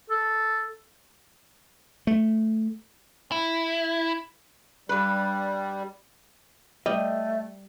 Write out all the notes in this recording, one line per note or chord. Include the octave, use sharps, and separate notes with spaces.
A4
A3
E4
G2 G3 B4
G3 A3 D#5